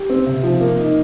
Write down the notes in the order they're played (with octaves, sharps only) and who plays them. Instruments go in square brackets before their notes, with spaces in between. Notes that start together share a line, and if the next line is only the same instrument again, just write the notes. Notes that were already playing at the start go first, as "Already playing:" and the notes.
Already playing: [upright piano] G4
C4
C3
F3
A#3
D#4